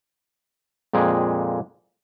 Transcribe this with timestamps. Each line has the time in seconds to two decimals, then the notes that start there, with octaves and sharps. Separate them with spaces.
0.93 F2 A#2 G#3 G#4 G5